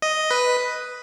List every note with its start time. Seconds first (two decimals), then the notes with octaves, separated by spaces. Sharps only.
0.02 D#5
0.31 B4